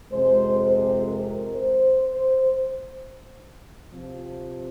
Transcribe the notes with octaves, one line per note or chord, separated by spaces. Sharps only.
F2 C3 G#3 C4 C5
C5
A#4
C5
C5
C3 F3 C4